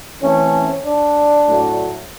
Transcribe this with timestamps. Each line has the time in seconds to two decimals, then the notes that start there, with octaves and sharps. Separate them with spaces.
0.22 E3 A3 C4 C#4
0.85 D4
1.48 A2 F#3 A3